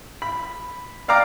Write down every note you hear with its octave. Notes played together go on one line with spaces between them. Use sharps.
B5
D5 F5 G5 A#5 D6